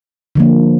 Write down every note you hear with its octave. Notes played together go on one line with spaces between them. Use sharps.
D3 F3 A#3